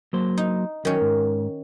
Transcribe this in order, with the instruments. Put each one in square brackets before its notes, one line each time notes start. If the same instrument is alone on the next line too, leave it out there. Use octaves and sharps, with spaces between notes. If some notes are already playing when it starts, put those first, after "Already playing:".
[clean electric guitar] F#3 A#3 C5
[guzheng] D#4
[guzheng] D#3 C#4 [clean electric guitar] F#3
[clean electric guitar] G#2